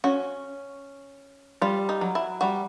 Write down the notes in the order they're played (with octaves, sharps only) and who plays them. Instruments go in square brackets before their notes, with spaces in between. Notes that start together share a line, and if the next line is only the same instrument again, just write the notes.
[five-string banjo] C#4 [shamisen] F#4
[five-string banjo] G3 [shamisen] F4
[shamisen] D#4
[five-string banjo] F#3
[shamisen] E4
[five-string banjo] G3 [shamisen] F#4